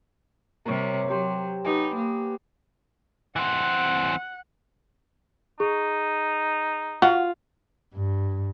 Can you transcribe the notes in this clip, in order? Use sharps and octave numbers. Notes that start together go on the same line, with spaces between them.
C3 G3 A#4 C#5
F#3 C4 G4 C5
B3 D#4 G4 G#5
A#3
E3 C4 F#5
D#4 G#4
F4 F#4 F#5
G2